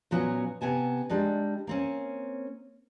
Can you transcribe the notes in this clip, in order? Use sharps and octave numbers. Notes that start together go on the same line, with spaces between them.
A#2 F#3 B3 C#4 F#4
C3 B3 G#5 A5
G3 G#3 D4 D#4
A#3 C4 C#4